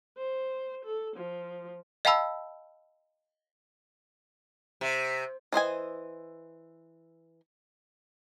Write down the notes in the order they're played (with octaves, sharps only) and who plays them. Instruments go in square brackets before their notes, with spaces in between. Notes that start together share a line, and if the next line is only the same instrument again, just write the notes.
[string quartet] C5
A4
F3
[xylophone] D#5 F5 G5 A5 B5 E6
[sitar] C3
[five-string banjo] E3 C5 D#5 G#5